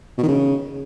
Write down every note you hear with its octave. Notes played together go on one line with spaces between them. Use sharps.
B2
D#3
C#3